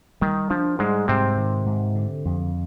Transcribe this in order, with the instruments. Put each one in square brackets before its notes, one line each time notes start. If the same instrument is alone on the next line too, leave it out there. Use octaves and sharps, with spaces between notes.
[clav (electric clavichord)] D#3 [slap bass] G3
[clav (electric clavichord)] F3 [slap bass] D4
[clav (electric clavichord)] G#2 G#3 [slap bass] G3
[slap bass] G#2 [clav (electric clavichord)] C3 C4
[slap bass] D#3
G#2
D3
F2